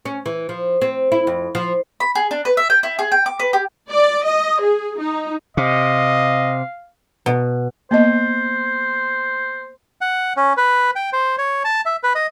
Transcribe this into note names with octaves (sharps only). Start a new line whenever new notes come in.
C#4
E3
F3
C4
E4
F2
F3
B5
G#4
D4
B4
E5
G5
E4
G#4
G5
D6
B4
G4
D5
D#5
G#4
D#4
C3 D#5 F5
B2
A#3 B3 C5 D#5
F#5
C#4
B4
G5
C5
C#5
A5
E5
B4
D#5